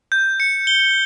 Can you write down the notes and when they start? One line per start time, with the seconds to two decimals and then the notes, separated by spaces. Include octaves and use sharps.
0.12 G6
0.40 C#7
0.67 G7